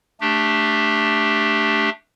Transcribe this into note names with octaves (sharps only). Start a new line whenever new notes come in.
A3 D4 G4